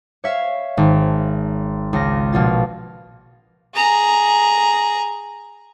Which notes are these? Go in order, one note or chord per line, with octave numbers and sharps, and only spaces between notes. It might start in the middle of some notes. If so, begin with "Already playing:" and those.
C#5 E5 F5
G#1
C#2 C#3 A#6
A#1 B2 F4 A6
G#4 A#5